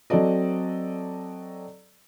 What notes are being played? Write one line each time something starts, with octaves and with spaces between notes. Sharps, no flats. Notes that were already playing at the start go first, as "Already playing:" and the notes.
F#3 C4 A4 D5 D#5